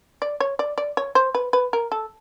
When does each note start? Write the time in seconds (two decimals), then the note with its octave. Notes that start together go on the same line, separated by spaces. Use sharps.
0.22 D5
0.40 C#5
0.59 D5
0.78 D5
0.97 C#5
1.15 C5
1.35 B4
1.53 B4
1.73 A#4
1.92 A4